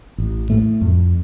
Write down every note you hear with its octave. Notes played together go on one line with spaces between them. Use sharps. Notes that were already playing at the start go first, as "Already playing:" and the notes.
A1
A2 A3
F2